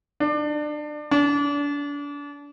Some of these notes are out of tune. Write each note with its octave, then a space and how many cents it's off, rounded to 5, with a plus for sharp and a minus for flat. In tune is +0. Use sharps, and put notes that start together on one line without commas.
D4 +25
D4 -35